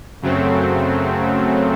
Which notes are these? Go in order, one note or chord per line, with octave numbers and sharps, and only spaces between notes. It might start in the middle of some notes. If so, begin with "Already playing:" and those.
F#2 C#3 F#3 A3 C4